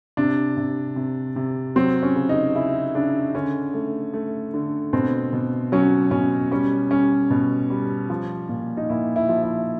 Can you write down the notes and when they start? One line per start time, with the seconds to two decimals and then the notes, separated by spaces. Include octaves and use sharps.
0.17 C3 D4
0.57 C3
0.96 C3
1.36 C3
1.76 F#3 C4
2.03 C#4
2.15 C#3
2.29 D#4
2.55 C#3 E4
2.95 C#3 D4
3.35 D3 C#4
3.74 A3
4.13 A3
4.54 D3
4.93 B2 C4
5.33 B2
5.72 F#3 C#4
6.11 B2 C#4
6.51 G3 C#4
6.91 G3 C#4
7.30 B2
7.70 G3
8.10 F3
8.49 A#2
8.77 D#4
8.89 A#2 E4
9.16 E4
9.29 F3
9.42 E4